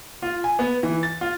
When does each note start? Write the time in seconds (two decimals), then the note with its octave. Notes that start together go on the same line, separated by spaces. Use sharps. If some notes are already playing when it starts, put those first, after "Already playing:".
0.22 F4
0.44 G#5
0.59 B3
0.83 E3
1.03 A6
1.21 F4